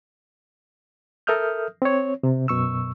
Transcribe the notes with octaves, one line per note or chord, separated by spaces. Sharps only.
A4 A#4 E5 D#6 F6 G6
C4 C#5
C3
F#2 B2 C#6 E6